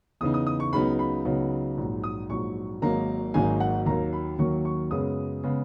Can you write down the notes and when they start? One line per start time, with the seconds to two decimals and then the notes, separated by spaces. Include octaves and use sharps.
0.21 E2 C#3 E3 B3 D#4 D#6
0.34 D#6
0.47 D#6
0.60 C#6
0.73 C#2 C#3 F#3 B3 D#4 B5
0.99 B5
1.25 C#2 C#3 F#3 B3 D#4
1.77 A#1 G#2 F#3
2.04 D#6
2.30 A#1 G#2 F#3 C#6
2.82 G#1 G#2 F#3 A#3 D#4 A#5
3.34 G#1 G#2 F#3 A#3 D#4 G#5
3.60 F#5
3.86 D#2 D#3 F#3 A#3 A#5
4.13 B5
4.38 D#2 D#3 F#3 A#3 C#6
4.65 C#6
4.91 F#2 C#3 G#3 B3 D#6
5.44 C#3 G#3 B3